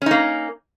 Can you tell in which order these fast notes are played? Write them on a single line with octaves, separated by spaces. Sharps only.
C#4 D#4 A#3